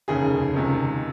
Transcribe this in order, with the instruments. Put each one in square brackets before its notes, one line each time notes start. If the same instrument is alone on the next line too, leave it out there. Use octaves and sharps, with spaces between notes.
[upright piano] F1 D#2 C#3 G#4
C#2 C3 D#3